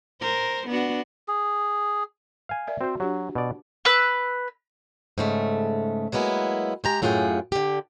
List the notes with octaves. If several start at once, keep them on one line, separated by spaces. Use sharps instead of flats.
A#4 C5
B3 D4 F#4
G#4
F5 G#5
A#4 D5 E5
C4 F#4 C5
F#3 D4 F#4 G4
B2 D5
B4 E6
G#2 C#3 A3
F#3 G#3 A#3 B3 E4
G#3 G4 A#5
F#2 A2 F4 G#4 F#5 G5
D3 G4